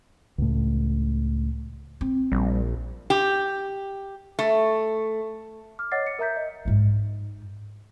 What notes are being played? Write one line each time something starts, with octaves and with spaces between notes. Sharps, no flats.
C#2 A2
C4
A#1 G3
G4
A3
D6 F6
C#5 D#5 F#5 D6 A6 C7
C#7
A#4 E5 A#5 G6 B6
D#5
G#2 D#4